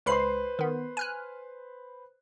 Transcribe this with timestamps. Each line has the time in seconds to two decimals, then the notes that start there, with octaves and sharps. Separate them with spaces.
0.06 C#2 B4 C5 B5 C6 C7
0.59 D#3 B3
0.97 G#5 F6 F#6